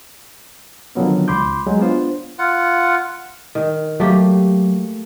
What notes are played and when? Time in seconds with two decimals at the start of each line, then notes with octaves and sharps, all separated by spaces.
0.95 D3 D#3 F3 F#3 B3 C#4
1.28 C#2 B5 C6 D6 G6
1.67 F#3 G#3
1.80 B3 D4 F4 C5
2.39 F4 F#5
3.55 D#3
4.00 F#3 A3 A#3 G4